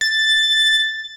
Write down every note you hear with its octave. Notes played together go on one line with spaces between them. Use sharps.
A6